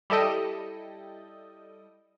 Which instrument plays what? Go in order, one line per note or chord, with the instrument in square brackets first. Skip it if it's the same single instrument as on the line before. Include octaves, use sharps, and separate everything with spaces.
[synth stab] G3 E4 A4 D#5 G5